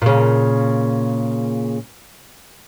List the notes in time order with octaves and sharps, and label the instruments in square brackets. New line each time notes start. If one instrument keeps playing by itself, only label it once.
[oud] A#2 C#3